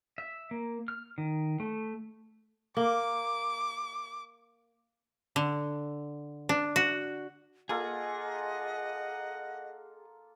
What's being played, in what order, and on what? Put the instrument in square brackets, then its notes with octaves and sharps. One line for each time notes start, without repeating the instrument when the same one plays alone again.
[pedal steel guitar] E5
A#3
F6
D#3
A3
[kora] A#3 [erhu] D6
[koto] D3
D4
F#4
[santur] A#3 F4 A4 [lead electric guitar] G#4 [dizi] D#5 [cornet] F#5